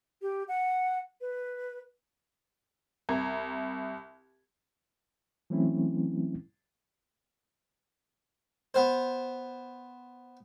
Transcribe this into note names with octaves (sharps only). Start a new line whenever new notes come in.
G4
F#5
B4
C2 A#5 G#6
E3 F#3 A3 C4 C#4 E4
B3 C5